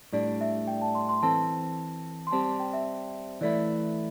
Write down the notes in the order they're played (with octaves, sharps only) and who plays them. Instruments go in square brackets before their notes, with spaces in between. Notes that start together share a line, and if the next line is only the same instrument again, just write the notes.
[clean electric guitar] A2 G3 D4 [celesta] D5
[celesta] E5
G5
A5
C6
C6
[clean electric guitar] E3 C4 A4 [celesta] A5
[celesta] C6
[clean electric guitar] G3 C4 G4 [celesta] A5
[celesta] A5
G5
E5
[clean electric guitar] E3 A3 E4 [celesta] D5